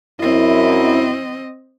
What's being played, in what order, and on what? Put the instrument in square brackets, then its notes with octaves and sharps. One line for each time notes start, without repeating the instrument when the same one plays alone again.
[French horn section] F#2 E4 [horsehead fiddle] C4 D#5